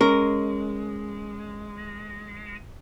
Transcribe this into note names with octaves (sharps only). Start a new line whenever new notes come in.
G#3 C#4 A#4